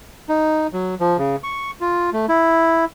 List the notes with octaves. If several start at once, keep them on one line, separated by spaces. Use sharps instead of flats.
D#4
F#3
F3
C#3
C#6
F4
A3
E4